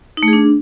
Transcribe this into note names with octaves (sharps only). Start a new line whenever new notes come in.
D#4
A3
G#4
D4